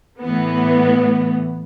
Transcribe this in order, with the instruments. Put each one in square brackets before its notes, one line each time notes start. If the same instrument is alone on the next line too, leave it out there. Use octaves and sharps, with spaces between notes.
[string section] A2 E3 B3